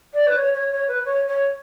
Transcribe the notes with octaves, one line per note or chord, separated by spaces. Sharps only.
D5
B4
C#5
C#5
C#5
B4
C#5
C#5